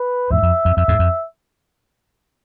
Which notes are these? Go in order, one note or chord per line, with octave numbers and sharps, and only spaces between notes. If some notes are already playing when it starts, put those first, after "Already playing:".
Already playing: B4
E2 G#2 E5
F2
F2
F2 E5
E2 G#2
F2